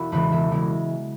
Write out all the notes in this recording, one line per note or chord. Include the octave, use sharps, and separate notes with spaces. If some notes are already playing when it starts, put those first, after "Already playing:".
Already playing: E1 E4 F#4
E2 C#3 E3 G#3 B4
E1 E5
C#3 E3 G#3